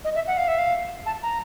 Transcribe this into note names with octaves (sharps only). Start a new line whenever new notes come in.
D#5
E5
F#5
F5
E5
F5
A5
A#5